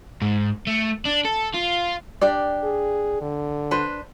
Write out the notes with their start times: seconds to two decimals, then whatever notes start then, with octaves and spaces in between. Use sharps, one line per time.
0.22 G#2
0.67 A3
1.05 D4
1.25 A4
1.54 F4
2.21 D4 G4 D5
2.64 G#4
3.21 D3
3.71 D4 B4 C5